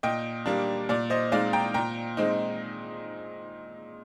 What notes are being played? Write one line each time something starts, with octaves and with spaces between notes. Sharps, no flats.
A#2 D#5 G5
G3 A#3 D4
A#2 D5
C5 D#5
G#3 C4 D#4 D5 F5
G5 A#5
A#2 G5 A#5
G#3 C4 D#4